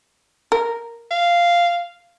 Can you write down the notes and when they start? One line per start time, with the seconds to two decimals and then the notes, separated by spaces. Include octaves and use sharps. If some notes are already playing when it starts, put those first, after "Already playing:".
0.52 A#4
1.11 F5